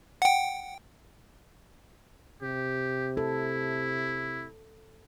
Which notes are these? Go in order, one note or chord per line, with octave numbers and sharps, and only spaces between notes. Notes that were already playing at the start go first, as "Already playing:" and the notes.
F#5 G5
C3 G4
E4 A4